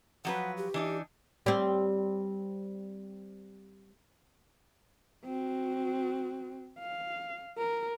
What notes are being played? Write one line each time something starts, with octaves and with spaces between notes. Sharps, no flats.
F3 F#3 B4 F#5
G4
E3 D4 D#4
G3 C4
C4 F#4
F5
A#4